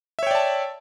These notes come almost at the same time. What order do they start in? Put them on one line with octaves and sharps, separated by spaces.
E5 C#5 G5 D5 A5